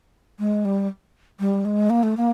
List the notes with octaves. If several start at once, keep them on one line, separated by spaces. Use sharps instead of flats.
G#3
G3
G3
G#3
A#3
A3
A#3